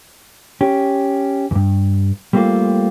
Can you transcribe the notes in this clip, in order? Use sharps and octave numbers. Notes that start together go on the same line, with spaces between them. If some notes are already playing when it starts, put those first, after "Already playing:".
C#4 G4
E2 G2
G3 A3 A#3 C4 F4